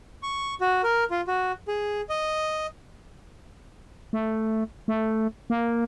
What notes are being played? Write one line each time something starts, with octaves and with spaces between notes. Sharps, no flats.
C#6
F#4
A#4
F4
F#4
G#4
D#5
A3
A3
A#3